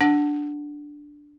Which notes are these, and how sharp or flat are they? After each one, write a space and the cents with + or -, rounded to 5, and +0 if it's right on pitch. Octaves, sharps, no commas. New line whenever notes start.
D4 +0 F#5 +0